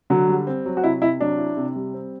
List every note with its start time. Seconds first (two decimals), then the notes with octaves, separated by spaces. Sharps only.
0.10 D3 F#3 F#4
0.29 G3
0.47 C4
0.66 F#3
0.77 F#4
0.84 C3 E4
1.01 C3 E4
1.20 F#3 D4
1.38 E4
1.57 C3
1.76 G3
1.94 C4